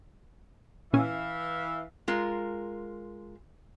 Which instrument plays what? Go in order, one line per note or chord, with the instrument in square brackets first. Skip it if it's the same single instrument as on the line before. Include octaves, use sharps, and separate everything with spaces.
[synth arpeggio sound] A#2 C#4 G#5 [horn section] E3 E5 F5
[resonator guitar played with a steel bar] G#3 F4 A#4